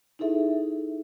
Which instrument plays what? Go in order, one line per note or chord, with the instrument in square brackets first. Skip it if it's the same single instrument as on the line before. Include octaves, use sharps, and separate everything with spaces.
[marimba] D#4 E4 G#4 A4 E5